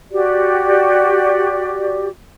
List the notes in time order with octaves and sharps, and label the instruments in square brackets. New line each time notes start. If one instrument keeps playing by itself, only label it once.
[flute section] F#4 G4 D5